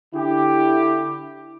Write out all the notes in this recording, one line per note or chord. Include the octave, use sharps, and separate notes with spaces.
D3 E4 G4